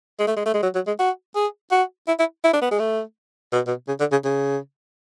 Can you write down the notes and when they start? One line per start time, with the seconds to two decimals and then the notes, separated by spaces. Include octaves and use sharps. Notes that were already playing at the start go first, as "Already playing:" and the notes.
0.19 G#3
0.27 A3
0.37 G#3
0.46 A3
0.54 G#3
0.63 F#3
0.75 F#3
0.87 G#3
0.99 F#4
1.36 G#4
1.71 F#4
2.08 E4
2.19 E4
2.44 E4
2.53 D4
2.62 B3
2.71 G#3
2.79 A3
3.52 B2
3.67 B2
3.88 C#3
4.00 D3
4.12 C#3
4.25 C#3